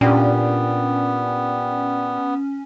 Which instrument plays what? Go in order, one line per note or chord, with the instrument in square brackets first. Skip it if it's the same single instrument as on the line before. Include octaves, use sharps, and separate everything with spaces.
[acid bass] A#2 [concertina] B3 [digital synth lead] C#4 [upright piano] D4 G4